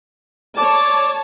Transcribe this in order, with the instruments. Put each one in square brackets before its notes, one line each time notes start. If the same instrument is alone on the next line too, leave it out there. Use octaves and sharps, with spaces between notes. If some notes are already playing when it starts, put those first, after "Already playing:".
[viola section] C#5 A5 [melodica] D5